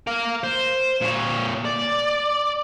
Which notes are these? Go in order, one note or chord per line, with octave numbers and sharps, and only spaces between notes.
A#4 F5
C5
A#2 C#5
D5